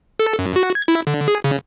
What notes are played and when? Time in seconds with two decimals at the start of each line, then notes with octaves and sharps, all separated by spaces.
0.19 A4
0.39 F#2
0.56 F#4
0.75 G#6
0.88 E4
1.07 D3
1.28 G#4
1.44 C#3